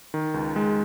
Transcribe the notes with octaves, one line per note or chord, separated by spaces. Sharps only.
D#3
C#2
G#3